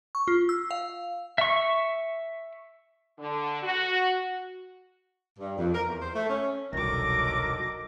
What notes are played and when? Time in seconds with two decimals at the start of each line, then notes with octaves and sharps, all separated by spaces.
0.15 C#6
0.28 F4
0.49 E6
0.71 F5
1.38 E5 C#6
3.18 D3
3.63 F#4
5.39 G2
5.58 F2
5.74 A#4
5.87 E2
6.01 C5
6.15 A3
6.30 C#4
6.73 E1 C2 D3 D#3 F#3 A4 D6 A#6